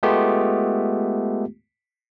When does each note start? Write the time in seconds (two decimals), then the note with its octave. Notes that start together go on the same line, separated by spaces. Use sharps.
0.03 G#3 A3 B3 F4 G4